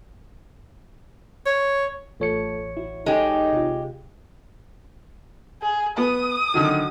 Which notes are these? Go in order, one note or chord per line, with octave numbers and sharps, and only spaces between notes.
C#5
A1 A3 F4 A4 C#5 C#7
E4 F#4
G#3 D#4 G4 A4
C3 F4
G#4
B3 D#6
D3 D#3 F#3